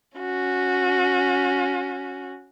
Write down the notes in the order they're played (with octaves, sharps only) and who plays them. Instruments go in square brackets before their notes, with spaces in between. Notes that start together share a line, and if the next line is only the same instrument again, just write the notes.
[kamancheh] C#4 F#4